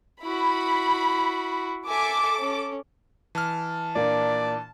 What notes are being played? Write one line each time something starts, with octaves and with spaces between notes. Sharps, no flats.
E4 F#4 B5
A4 E5 G#5 D6
C#4
E3 A5 F6
A#2 A#3 D4 D5